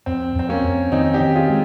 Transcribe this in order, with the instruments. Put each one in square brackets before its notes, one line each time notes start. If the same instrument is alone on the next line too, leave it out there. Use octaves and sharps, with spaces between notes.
[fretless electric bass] F2 [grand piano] C4
[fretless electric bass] F2 [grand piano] C4
[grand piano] A#3 C#4
[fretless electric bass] F2
[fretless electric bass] D#3 [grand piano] C4 D#4
[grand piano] D#4 G4
[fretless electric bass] D#3
[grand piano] F4 G#4
[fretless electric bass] G#3